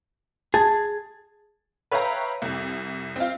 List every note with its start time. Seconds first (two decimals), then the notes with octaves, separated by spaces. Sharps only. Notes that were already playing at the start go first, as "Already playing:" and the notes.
0.54 G#4 A5 G#6 A6
1.92 B4 C#5 E5 F5 G5 A#5
2.42 C2 F2
3.16 C4 F4